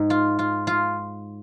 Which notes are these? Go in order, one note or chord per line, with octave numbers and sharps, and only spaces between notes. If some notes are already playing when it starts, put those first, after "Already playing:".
Already playing: G#2
F4
F4
F4